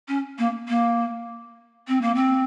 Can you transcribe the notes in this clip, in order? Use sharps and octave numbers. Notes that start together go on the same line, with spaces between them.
C#4
A#3
A#3
C4
A#3
C4